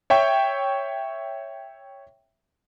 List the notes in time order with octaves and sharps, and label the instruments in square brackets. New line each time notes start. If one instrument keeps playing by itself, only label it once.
[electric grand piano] C#5 E5 G5 C#6